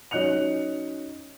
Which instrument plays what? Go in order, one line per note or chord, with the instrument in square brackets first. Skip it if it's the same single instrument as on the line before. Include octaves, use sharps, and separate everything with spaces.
[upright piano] F#3 C#4 D#4 F#6 C#7 F7